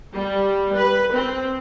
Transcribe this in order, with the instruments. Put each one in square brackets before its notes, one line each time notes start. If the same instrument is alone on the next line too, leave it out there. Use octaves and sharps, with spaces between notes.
[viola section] G3
B4
C4